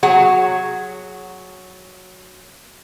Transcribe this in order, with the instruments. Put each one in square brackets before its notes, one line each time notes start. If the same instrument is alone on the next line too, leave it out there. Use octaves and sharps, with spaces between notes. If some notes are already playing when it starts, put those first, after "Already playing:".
[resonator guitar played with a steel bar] F#3 G#4 F#5